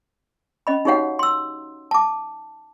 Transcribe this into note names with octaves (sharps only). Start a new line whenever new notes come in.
C#4 D#5 B5
D#4 F#4 G4 C#5 F5 F#5
C6 E6
A5 D6